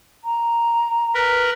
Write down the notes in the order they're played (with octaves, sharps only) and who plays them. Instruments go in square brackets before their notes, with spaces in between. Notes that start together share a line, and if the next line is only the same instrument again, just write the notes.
[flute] A#5
[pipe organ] A#4 B4